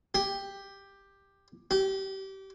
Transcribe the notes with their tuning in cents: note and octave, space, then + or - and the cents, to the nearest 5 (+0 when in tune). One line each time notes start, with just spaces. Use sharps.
G4 +10
G4 -25